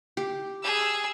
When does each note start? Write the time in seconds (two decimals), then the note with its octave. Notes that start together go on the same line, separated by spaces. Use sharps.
0.17 G4
0.63 G#4 E6